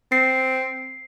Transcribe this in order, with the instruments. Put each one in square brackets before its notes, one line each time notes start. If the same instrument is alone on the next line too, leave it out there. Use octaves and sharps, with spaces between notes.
[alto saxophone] C4 [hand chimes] C7